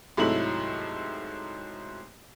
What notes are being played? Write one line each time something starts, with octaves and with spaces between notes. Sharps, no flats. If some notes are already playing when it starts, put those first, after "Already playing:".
C2 G#2 F#3 A3 E4 F#7